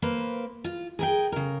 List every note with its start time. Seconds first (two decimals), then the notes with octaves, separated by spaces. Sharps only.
0.02 A#3 B4 C5
0.64 F4
0.99 G#4 A#4 G5
1.32 C#3 A#4